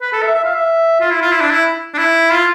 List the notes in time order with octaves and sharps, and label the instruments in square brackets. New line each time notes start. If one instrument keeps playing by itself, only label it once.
[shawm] B4
A4
E5
E5
F5
E5
F4
E4
F4
E4
D4
E4
D4
E4
F4